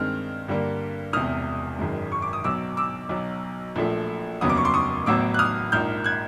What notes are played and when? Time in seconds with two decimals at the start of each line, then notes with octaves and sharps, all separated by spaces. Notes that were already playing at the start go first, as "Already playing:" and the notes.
Already playing: G2 D#3 G#3 C4 F6
0.48 G2 D3 G3 A#3
1.13 E1 E2 C3 D#6 F6
1.79 G#1 F#2 D#3 G#3
2.12 C#6
2.22 D6
2.33 D#6
2.44 B1 B2 F#3 D6 E6
2.77 D6 E6
3.09 B1 B2 F#3
3.76 A#1 A#2 F3 A3
4.41 F1 D#2 C#3 F#3 B3 D#6
4.49 D6
4.57 C#6
4.65 C6 D6
4.74 C#6 D#6
5.06 A1 A2 F#3 B3 D6 E6
5.34 F#6
5.39 D#6 F6
5.72 A#1 G#2 F3 A#3 F6 G6
6.04 F#6 G#6